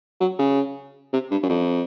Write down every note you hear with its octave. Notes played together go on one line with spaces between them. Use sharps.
F#3
C#3
C3
G2
F#2
F2